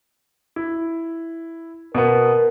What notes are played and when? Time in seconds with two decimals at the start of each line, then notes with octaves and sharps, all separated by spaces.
0.56 E4
1.95 B2 B3 A#4